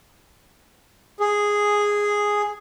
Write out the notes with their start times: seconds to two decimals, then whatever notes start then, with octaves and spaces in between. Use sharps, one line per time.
1.20 G#4